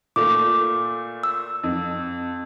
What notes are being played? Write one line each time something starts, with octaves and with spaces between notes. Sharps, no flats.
A#2 A3 D6
E6
F2